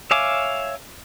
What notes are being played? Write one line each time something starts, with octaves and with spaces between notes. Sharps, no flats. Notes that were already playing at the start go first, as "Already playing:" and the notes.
C#5 E5 F5 G#5 D6